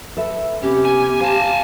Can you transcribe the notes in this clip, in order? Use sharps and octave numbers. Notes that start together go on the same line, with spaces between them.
A4 B4 E5
C3 B3 C#4 G4
G#5
C5 F5 G#5 A5